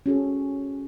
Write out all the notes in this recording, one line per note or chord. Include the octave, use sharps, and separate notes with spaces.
C#4 F#4 G#4 A4